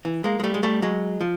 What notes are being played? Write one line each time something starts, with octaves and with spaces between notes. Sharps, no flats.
E3
G#3 A#3
G#3
G3 A3
G#3
G3 A3
F#3 G#3
F3